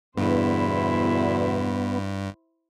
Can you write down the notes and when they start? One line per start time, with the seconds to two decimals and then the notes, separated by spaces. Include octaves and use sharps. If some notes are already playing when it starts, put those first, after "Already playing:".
0.18 E2 G2 B2 D3 B3 E4 C5